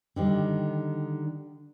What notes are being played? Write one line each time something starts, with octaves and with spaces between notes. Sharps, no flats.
D3 D#3 G3